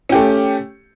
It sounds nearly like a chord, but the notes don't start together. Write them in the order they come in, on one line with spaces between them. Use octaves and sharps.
C#4 G4 A3